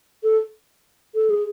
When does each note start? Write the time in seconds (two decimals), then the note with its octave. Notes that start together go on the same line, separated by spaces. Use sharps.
0.24 A4
1.15 A4
1.30 G#4